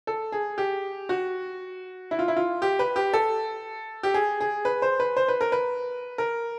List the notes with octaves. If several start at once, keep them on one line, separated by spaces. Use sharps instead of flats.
A4
G#4
G4
F#4
E4
F4
E4
F4
G4
B4
G4
A4
G4
G#4
G#4
B4
C5
B4
C5
B4
A#4
B4
A#4